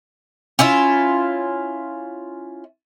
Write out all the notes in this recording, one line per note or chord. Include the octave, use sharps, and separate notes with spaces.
C#4 E4 F4 E5